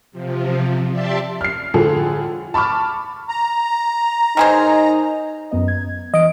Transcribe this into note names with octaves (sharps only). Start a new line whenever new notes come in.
C3 F3
G4 D5 E5 A5 C6
F6 C7
A2 D3 F3 F4 G#4 A4
A5 B5 C#6 D6 F6
A#5
D#3 D#4 G#4 C5
F#2 B3 D#5
G#6
E3 D#5 D7